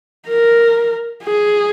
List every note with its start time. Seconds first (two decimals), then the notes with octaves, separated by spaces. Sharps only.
0.28 A#4
1.24 G#4